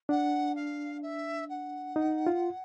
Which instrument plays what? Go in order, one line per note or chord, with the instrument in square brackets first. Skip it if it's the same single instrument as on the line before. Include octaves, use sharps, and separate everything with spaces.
[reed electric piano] D4 [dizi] F#5
[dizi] F5
E5
F#5
[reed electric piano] D#4
F4